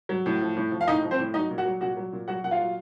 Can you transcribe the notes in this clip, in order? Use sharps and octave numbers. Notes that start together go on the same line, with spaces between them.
F#3
A2
F3
A2
F3
F5
A2 D#4 D#5
F3
C4 C5
A2
F#3 D#4 D#5
A#2
F#4 F#5
F#3
A#2 F#4 F#5
F#3
A#2
F#3 F#4 F#5
A#2 F#5
F4 F5
F#3